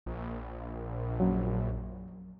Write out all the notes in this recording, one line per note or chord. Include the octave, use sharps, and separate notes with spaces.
A#1
F#2 F#3